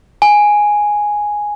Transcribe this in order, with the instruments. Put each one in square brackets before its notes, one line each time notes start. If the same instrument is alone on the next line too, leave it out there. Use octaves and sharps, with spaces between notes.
[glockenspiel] G#5